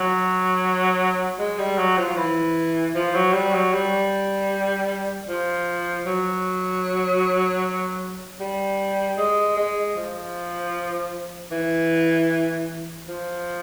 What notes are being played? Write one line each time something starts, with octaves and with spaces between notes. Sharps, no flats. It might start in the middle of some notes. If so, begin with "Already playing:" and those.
Already playing: F#3
G#3
G3
F#3
F3
F3
E3
F3
F#3
G3
F#3
G3
F3
F#3
G3
G#3
G#3
F3
E3
F3